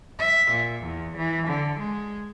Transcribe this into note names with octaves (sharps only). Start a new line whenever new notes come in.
E5
A#2
E2
E3
D3
G#3